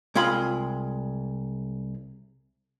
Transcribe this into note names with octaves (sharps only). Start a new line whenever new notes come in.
C2 G#3 F4 B5